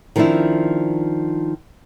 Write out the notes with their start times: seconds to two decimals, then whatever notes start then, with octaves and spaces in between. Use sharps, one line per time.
0.16 D#3 F3 C4 D4 E4